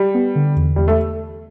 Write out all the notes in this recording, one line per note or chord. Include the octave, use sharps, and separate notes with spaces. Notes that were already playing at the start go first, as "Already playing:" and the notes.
Already playing: G3
B3
D3
E2
E2 G3
A3